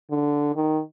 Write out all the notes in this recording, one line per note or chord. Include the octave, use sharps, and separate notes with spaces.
D3
D#3